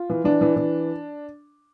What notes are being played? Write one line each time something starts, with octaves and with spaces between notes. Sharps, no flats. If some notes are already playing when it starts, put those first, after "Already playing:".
Already playing: F4
E3
E3 D4
E3
E3